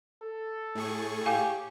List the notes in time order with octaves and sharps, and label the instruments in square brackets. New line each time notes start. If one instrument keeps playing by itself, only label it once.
[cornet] A4
[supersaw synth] A2 G#4 C#6
[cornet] G4 [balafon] F5 G#5